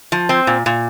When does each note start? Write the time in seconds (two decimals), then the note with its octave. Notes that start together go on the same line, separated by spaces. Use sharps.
0.12 F3
0.29 C4
0.47 A#2
0.66 A#2